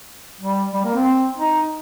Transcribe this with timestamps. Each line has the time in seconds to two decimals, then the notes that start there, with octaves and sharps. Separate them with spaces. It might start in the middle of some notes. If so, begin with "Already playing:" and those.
0.41 G3
0.73 G3
0.84 A#3
0.95 C4
1.38 D#4